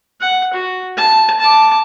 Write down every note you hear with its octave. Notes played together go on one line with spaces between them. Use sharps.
F#5
F#4
A5
A5 D6